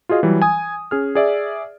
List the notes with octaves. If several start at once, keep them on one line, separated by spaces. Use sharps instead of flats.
F4 F#4 G#4 D#5 F5
E3 F#3 G3
G#5 D#6
C#4 G#4 F6
G#4 D5 E5